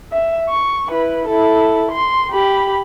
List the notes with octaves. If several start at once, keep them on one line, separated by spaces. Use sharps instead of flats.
E5
C#6
E4 B4
E4 A4
C6
G4 B5